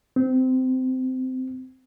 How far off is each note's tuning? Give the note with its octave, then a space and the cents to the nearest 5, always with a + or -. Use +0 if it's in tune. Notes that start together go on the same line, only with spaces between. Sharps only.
C4 -20